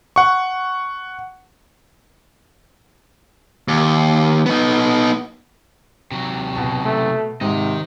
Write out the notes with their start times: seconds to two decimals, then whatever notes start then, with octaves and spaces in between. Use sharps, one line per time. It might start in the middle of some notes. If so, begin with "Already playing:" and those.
0.16 F#5 C#6
3.68 D#2
4.46 B3 D#4
6.12 C3 F#3
6.55 B2 A5
6.85 A3
7.41 G#2 C3 D#3 D#5